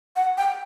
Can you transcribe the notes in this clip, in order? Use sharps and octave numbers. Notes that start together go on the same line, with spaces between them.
F#5
G5